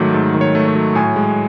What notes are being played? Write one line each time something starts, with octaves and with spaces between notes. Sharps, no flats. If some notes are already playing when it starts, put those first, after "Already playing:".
Already playing: G#2 D#3 F#3 A3 F#4
G#2 A4
D#3
C#5
A3
C#5
F#3
A2 G#5
G#3